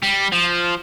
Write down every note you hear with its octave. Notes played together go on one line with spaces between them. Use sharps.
G3
F3